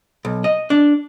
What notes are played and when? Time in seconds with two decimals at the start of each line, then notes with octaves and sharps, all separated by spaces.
0.25 B1
0.44 D#5
0.70 D4